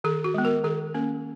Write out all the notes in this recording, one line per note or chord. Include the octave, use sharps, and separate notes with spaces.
D#3 G#4
F#4
G#3 B3
A#4
D#3 G#4
A#3 C#4